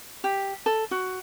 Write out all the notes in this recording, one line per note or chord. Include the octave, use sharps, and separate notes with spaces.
G4
A4
F#4